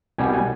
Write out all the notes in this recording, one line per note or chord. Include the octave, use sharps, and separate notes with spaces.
C2 B2 G3 G#5
G#5